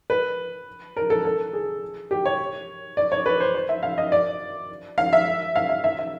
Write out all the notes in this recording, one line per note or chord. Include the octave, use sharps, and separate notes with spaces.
B4
A#4
A4
A4
G#4
G4
C#5
D5
C#5
B4
C5
C5
E5
F5
D#5
D5
F5
E5
F5
E5
E5
E5